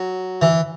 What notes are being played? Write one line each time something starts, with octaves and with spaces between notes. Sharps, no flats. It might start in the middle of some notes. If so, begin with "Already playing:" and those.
Already playing: F#3
E3